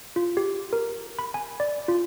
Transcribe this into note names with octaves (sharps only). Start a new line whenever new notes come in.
F4
G4
A#4
B5
G#5
D5
F4